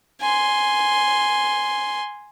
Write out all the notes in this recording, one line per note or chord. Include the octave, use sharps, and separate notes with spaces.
G#5 C6